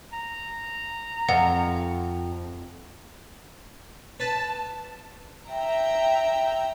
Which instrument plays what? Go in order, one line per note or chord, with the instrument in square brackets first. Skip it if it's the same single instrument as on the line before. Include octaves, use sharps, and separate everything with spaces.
[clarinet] A#5
[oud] F2 [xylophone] F#5
[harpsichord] B4 [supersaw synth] A5
[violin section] E5 G5 A#5